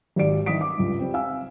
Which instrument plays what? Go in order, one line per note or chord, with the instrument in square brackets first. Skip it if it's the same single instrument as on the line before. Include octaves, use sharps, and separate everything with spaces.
[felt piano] G#1 G4 D5 D7
D#3 E3 G3 D#6 B6 D7
D6
C#2 G2
G3 C4
F5 G#5 E6